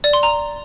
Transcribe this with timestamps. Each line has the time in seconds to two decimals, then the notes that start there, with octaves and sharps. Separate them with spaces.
0.04 D5
0.13 C6
0.23 A#5